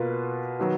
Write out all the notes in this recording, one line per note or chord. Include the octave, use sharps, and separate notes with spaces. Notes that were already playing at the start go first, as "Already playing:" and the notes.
Already playing: B2 A#3 F4 B4
D#3 F#3 B3